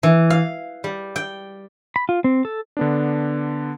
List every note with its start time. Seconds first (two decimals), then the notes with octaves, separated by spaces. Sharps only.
0.03 E3
0.30 F5
0.84 G3
1.16 G5
1.96 B5
2.09 F4
2.24 C4
2.45 A4
2.77 D3 B3 D4